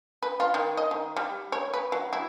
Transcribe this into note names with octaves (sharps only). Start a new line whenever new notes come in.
B4
F4
D#3
D#5
D#3
G3
C#5
B4
F#3
E4